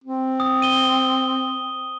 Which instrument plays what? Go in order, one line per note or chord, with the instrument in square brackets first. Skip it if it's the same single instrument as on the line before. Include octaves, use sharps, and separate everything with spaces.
[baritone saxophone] C4
[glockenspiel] D#6
D#7 G7